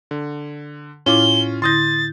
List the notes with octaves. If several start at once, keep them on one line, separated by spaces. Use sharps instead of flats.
D3
A2 C#4 E4 F4 D6 G7
D3 E4 C6 D#6 G6 A6 A#6